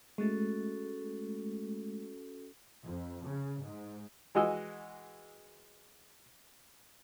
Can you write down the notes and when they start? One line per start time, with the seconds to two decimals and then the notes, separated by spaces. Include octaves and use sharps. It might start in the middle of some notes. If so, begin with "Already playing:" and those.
0.18 G#3 A3 C#4 F#4 A4
2.83 F2
3.25 C#3
3.61 G#2
4.35 E3 G#3 F#4 D#5 E6